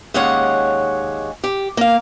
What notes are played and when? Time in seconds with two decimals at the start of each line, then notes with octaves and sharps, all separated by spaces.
0.14 D#2 G#3 C#4 C#5 F#5
1.44 G4
1.77 A#3 F5